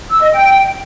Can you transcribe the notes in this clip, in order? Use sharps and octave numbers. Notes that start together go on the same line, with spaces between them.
E6
D#5
G5